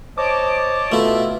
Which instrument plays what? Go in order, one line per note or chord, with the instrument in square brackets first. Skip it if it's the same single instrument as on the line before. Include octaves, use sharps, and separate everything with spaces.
[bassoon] C5 [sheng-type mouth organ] C#5 D#5 A5 [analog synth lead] D6
[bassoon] B2 [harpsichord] A3 E4 [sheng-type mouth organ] F4 E5